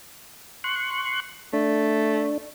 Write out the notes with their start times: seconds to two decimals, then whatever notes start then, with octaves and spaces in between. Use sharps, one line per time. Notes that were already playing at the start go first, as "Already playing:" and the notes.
0.64 C6 C#6 F#6
1.53 A3 D4